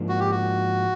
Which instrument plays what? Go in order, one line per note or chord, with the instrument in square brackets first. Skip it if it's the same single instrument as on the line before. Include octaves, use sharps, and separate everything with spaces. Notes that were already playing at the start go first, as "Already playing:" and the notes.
Already playing: [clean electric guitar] G#2 F3 A#3 D4
[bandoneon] F#4
G4
F#4